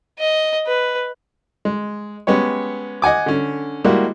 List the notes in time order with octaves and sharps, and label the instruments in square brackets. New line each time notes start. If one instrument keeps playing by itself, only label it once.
[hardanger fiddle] D#5
B4
[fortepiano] G#3
G#3 B3 C#4 G4 C#5
D#5 F#5 G#5 D6
D3 C#4
G3 G#3 A#3 E4 F#4